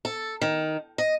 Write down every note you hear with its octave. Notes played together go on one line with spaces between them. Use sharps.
A4
D#3
D#5